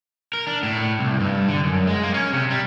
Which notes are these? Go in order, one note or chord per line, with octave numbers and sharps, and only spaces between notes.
A#4
D4
A2
C2
G2
D3
F#2
G#3
A#3
C#4
C3
G3